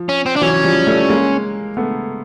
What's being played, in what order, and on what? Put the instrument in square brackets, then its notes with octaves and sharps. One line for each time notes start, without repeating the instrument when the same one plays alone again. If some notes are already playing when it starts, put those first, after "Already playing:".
Already playing: [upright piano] F3
[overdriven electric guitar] C#4
C4
D4
[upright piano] E3 F#3 [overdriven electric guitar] C#4
[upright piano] F3 G3
G3 A3
G#3 A#3
A3 B3